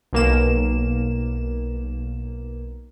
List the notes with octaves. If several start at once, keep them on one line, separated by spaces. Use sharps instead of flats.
B1 A#3 E7